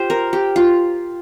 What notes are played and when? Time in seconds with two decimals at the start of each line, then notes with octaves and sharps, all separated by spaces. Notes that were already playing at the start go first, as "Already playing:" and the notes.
Already playing: F4 G4 C5
0.10 A#4
0.33 G4
0.56 F4